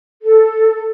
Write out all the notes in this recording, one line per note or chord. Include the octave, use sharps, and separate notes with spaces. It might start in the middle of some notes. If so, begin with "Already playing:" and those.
A4